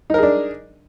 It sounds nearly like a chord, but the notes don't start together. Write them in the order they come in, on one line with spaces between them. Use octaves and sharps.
D#4 A#4 G#4 D4